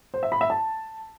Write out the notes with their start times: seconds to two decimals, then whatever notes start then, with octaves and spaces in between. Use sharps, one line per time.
0.14 C5
0.23 E5
0.32 B5
0.41 E5
0.50 A5